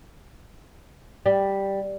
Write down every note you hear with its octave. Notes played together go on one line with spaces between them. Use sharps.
G3